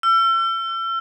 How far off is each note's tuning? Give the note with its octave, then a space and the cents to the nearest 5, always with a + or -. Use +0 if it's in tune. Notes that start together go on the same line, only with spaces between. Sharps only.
E6 +40